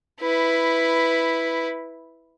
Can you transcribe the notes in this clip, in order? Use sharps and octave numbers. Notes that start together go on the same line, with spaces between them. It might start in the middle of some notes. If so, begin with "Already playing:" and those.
E4 B4